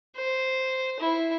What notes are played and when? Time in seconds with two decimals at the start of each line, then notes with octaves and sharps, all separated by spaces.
0.16 C5
1.00 E4